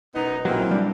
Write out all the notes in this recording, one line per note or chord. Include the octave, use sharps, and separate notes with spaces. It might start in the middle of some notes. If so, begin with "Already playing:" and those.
E1 F#2 B3 D#4
A#1 E3 F#3 A#3 C4
G3 D4